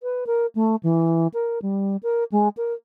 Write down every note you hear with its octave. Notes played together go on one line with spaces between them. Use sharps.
B4
A#4
A3
E3
A#4
G3
A#4
G#3
A#4